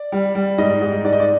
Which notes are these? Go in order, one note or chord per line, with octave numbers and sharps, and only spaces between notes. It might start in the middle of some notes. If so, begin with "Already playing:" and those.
Already playing: D5
G3
G3
G#2 D#5
G#2
G#2 D5
D#5
D5